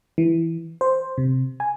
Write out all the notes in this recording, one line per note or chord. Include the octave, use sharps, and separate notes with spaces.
E3
C5
C3
G#5